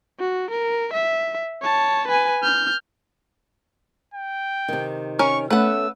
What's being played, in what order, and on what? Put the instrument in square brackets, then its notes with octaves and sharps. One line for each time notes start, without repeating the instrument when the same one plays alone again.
[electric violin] F#4
A#4
E5
C#5 A5
B4 G#5
F6 G6
[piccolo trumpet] G5
[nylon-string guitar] C3 D#3
[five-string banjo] C#4 A#4 [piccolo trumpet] C#6
[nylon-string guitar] A3 B3 C#4 [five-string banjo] B4 F#5 [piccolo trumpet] E6